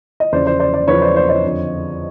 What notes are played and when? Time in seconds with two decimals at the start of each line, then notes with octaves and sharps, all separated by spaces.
0.20 D#5
0.32 E2 C#3 F3 C5 D5
0.46 C5 D5
0.60 C5 D5
0.74 C5 D5
0.88 E2 C#3 F3 B4 C#5
1.02 C5 D5
1.16 C5 D5
1.29 C#5 D#5
1.43 F2 D3 F3